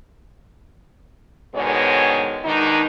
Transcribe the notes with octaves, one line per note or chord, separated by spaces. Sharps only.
G#2 B2 D3 D#3 G#3 C#5
B2 D#3 G#3 D4 D#4